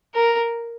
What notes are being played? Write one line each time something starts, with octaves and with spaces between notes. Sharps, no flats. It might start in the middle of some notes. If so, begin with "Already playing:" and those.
A#4